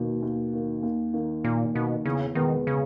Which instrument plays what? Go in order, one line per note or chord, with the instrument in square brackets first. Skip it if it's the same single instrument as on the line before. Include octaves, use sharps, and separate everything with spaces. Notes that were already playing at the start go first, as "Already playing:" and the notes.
Already playing: [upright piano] D#2 D#3 A#3 [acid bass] B2
[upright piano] D#2
D#3 A#3
D#2
D#3 A#3
[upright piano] D#2 [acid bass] A#2
[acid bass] B2 [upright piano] D#3 A#3
[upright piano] E2 [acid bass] C#3
[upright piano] B2 G#3 B3 [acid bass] D#3
[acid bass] C#3